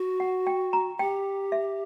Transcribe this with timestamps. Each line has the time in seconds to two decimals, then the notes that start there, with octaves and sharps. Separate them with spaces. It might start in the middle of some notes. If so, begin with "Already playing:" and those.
Already playing: F#4
0.20 F#5
0.47 G5
0.73 A#5
0.99 G4 G5
1.52 E5